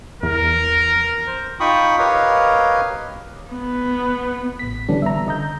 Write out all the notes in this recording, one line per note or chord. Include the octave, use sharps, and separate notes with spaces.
E2 A#4
C5
D#4 F4 G5 B5 C#6 D#6
G4 A#4 B4 C#5 D#5 F5
B3
A1 B6
D3 E3 G3 B3 C#4 D4
E5 A#5
D3 D#5 A#5 G6